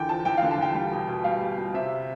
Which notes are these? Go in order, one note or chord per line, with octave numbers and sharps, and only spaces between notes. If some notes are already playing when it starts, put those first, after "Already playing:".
Already playing: E2 D3 G5
F3 A5
E2 G5
F5
D3
A5
E2 G5
G3
B2
B2
G3 F5
G3
B2
C3 E5